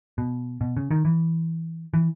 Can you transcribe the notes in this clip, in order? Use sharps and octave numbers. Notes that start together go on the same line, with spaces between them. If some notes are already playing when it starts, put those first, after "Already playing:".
B2
B2
C#3
D#3
E3
E3